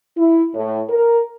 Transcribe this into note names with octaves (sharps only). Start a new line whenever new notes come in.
E4
A2
A#4